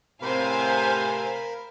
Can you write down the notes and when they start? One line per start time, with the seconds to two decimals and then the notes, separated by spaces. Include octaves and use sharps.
0.22 A2 C3 A#4 C5 F5 G#5 B5